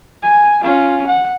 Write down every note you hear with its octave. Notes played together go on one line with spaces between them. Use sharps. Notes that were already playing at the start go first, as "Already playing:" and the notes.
G#5
C#4 F4
F#5